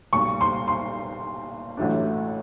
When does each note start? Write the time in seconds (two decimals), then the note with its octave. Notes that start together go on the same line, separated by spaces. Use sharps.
0.13 B1 A#2 G3 C#6
0.41 C6
0.68 C6
1.77 A1 A2 F#3 A3 D4